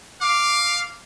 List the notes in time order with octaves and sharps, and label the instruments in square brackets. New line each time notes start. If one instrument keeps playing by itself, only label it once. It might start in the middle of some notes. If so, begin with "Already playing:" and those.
[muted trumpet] F5 [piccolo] D6